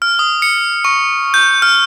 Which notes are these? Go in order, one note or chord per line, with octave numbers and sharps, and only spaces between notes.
F6
D#6
C#7
C#6
G6
F6